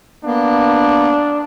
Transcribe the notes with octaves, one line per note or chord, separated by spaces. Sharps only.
A#3 B3 D4